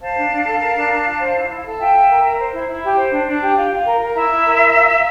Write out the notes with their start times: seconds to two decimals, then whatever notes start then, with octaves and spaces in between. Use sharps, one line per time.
0.01 C5 F5 A5
0.16 D4
0.31 D4
0.46 A4
0.60 A#4
0.75 D4
0.89 D4
1.05 F4
1.19 C5
1.34 E4
1.49 E4
1.64 A4
1.79 F4 E5 G5
1.94 F4
2.09 A#4
2.23 A#4
2.38 C5
2.53 E4
2.68 E4
2.82 G4
2.97 C5
3.11 D4
3.27 D4
3.41 G4
3.56 F4
3.71 F4
3.85 A#4
4.01 A#4
4.15 E4 E5
4.30 E4
4.45 A#4
4.59 A#4
4.75 F4
4.89 F4